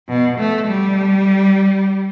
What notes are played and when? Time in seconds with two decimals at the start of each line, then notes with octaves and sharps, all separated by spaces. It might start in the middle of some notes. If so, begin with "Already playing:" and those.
0.08 B2
0.38 A3
0.67 G3